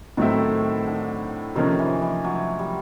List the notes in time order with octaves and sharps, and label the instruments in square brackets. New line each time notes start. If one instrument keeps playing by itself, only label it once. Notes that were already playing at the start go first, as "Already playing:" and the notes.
[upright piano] A2 F#3 A3 C4 E4 [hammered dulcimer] D#3
[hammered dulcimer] D3
[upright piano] C3 F3 A#3 C#4 [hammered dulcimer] D#3
[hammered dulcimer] E3
E3
F#3
G3